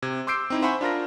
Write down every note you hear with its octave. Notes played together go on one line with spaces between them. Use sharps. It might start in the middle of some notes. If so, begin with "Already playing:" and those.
C3 G#6
C6 D6 E6 G6 C7 D7
C4 D#4 E4
C5 E5 F#5 G#5 B5 C#6
D4 F4 A#4 A#6